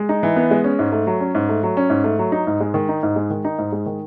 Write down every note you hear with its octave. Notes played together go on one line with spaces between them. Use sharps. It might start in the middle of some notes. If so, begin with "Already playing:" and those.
Already playing: G#3
D#4
E3
B3
G#3
C#4
G#2
A3
F#3
C#4
G#2
A3
F#3
C#4
G#2
A3
F#3
D#4
G#2
G#3
D#3
D#4
G#2
G#3
D#3
D#4
G#2
G#3
D#3